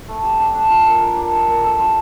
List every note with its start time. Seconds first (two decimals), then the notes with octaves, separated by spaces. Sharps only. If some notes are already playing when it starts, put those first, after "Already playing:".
0.08 A3
0.23 G4
0.40 D4
0.55 D4
0.70 F4
0.86 A#4
1.01 A#4
1.17 D4
1.32 G3
1.48 A#4
1.64 A4
1.79 F4